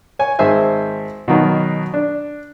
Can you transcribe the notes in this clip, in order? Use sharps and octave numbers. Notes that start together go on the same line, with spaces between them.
C#5 G#5
G#1 G#3 C5 E5 G#5
B2 D#3 F#3
D4